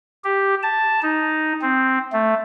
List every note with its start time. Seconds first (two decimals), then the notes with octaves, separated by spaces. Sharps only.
0.24 G4
0.63 A5
1.02 D#4
1.61 C4
2.12 A3